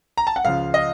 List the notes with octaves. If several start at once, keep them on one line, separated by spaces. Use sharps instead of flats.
A#5
A5
F#5
C#2 C#3 F3 F5
D#5